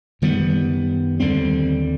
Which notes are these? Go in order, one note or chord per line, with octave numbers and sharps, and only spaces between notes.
F#2 D#3 G3 B3
D#2 D3 G3 C4